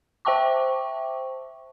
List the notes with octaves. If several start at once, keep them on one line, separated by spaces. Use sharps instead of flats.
C5 E5 G5 A5 C#6 D6